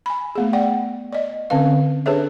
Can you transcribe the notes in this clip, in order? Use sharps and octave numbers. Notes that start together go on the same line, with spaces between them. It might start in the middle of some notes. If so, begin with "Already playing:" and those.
G#5 B5
A3 B3 G#4
D5 F#5 G5
D5 D#5
D3 C4 C#4 B4 F5
D4 G#4 A4 B4 C#5 E5